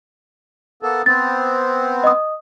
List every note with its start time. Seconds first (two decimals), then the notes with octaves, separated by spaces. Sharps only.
0.83 A#3 B3 A4
1.06 B3 C4 A6
2.04 D#5 D#6